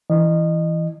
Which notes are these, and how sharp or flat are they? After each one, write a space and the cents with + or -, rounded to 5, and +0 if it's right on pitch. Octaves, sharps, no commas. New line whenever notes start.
E3 +0 D#5 -25